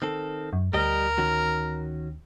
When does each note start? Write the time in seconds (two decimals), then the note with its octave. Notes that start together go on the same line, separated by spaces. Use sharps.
0.02 D#3 C4 A4
0.53 F#2
0.73 D2 G3 G4 A#4 D#5
1.18 D#3 C#4 F#4